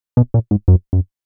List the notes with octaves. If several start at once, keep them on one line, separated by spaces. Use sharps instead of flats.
B2
A#2
G#2
F#2
F#2